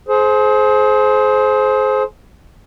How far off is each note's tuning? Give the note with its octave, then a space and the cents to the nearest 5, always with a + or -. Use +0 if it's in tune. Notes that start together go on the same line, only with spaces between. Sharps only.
G#4 +35 C5 +0